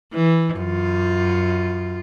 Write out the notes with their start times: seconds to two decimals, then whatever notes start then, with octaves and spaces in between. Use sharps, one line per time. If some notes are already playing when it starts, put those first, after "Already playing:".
0.13 E3
0.57 F#2 F4